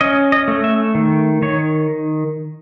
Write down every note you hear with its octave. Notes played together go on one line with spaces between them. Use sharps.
C#4 D#5
D#5
A3
E5
D#3
D#3 C#5